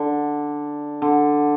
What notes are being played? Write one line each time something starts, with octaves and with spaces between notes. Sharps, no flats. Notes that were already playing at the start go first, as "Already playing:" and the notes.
Already playing: D3
D3